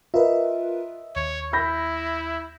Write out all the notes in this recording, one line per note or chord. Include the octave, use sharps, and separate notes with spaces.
F4 A#4 B4 D#5 E5
D#2 C#5
E4 B5 G6 A#6